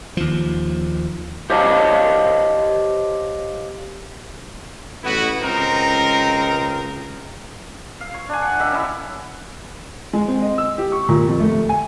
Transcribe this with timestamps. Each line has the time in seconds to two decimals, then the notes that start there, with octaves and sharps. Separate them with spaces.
0.17 D#2 F3
1.50 G4 C5 C#5 D#5 F5 A5
5.04 A1 B3 E4 F#4
5.42 C#2 C4 D#4 A#4
8.01 F5
8.14 C#5
8.29 D4 G#5
8.42 F#5
8.59 D#3 G4 E5
8.72 C#4 E4
10.13 G#3
10.28 C4
10.42 D#5
10.58 E6
10.78 G4
10.92 C#6
11.09 A#2
11.28 F2
11.40 A3
11.69 G#5